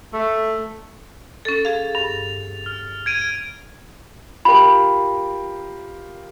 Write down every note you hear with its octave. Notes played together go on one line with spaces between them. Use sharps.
A3
C#4 A4 A6
G#4 F5
G2 F7
F6
G#6 D7 D#7
F4 G4 A#4 B5